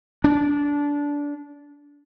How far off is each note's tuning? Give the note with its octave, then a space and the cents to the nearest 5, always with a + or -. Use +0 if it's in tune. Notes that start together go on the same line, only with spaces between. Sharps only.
D4 -20